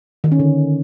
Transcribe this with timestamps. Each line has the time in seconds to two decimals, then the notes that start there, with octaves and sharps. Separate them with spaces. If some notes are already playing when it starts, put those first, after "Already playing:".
0.24 D#3
0.32 C#4
0.39 D3